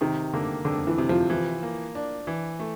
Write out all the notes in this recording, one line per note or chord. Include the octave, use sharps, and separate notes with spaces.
C3 D#3
D3 A#3
F2 D3
E3
C3
F3
E3 F3
A#3
D4
E3
A3